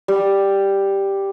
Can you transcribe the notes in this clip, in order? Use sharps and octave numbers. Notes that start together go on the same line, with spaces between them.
G3